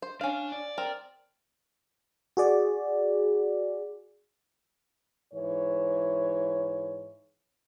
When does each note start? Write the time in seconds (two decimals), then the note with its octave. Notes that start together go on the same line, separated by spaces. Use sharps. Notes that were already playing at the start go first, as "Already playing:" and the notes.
0.02 C5
0.21 C#4 D4 F5
0.52 D5
0.78 C4 A#4
2.37 F#4 G#4 D5
5.34 G#2 E3 C#5